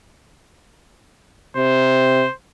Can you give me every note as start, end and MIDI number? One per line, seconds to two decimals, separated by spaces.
1.57 2.24 48
1.57 2.33 72